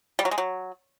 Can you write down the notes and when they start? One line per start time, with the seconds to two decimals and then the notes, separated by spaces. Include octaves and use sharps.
0.19 G3
0.25 F#3
0.31 G#3
0.38 F#3